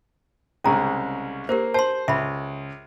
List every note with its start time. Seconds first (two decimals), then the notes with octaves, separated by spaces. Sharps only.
0.64 C2 C#3 G#3 C#4 A#5
1.49 A#3 G4 A#4 C5
1.74 C5 A5 C6
2.08 C#2 E5 B5